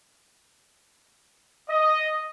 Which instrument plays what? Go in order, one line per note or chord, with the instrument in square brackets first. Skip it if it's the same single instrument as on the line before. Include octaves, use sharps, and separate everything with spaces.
[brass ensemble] D#5